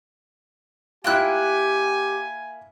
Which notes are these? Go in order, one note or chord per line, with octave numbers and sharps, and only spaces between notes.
A#3 E4 F4 G4 G5 G#5 F#6